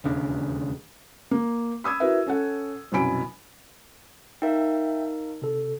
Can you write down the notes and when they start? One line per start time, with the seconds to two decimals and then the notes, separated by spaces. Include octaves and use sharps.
0.04 E1 D#2 C#3 D4
1.31 A#3
1.84 B5 D#6 E6 G#6
2.00 E4 F#4 A#4 B4 E5
2.27 C#4 A4 F#5
2.92 C2 F#2 B2 G#5 B5 D7
4.42 D#4 A#4 E5 F5 G5
5.42 C3 A4